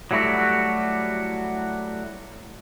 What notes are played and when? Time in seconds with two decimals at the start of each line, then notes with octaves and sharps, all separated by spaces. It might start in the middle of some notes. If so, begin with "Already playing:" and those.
0.11 F#3 G3 A3 E4 F#4